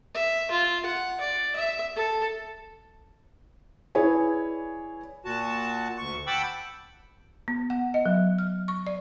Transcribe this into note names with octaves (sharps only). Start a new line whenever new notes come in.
E5
F4
F#5
D5
E5
A4
E4 G#4 B4 C#5 D5 G#5
A#2 F#4 A5
D2 C#6
F#5 G5 A5 B5 D6 E6
B3
F#5
D#5
F#3
F6
C#6
D5